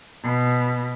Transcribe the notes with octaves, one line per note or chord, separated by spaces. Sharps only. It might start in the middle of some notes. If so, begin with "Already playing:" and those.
B2